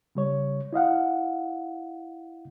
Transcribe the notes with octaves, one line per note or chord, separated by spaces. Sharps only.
C#3 G3 C#5
E4 D#5 F5 F#5